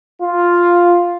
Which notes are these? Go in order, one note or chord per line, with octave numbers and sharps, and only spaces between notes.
F4